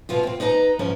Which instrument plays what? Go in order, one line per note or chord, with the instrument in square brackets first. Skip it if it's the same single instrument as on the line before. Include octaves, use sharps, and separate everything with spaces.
[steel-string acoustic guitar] B2 E3 B3 F4
C4 F4
D#4 B4 D#5 A5 A#5
G#2 F3 B3 C#4 E4